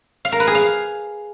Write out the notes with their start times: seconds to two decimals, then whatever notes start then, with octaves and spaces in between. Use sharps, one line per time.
0.25 F5
0.32 A#4
0.40 B4
0.47 G#4
0.55 F5